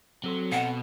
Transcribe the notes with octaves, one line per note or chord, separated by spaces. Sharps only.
F#3 C4 A4 C6
B2 F#5